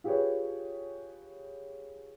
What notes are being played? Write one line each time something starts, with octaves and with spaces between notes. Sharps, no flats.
F4 G4 G#4 B4 C#5